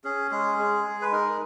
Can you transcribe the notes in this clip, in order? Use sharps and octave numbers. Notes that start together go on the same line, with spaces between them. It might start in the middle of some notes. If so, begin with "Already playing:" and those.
C#4 G#4
G#3 G#4
G#3
G#3
B4
D#4 A#4